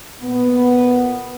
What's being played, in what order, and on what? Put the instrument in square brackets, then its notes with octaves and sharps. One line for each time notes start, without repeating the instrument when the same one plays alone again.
[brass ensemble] A#2 B3